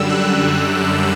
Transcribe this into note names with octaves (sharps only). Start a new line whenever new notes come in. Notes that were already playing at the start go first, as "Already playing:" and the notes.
Already playing: F#2 D3 G3 E6
F#6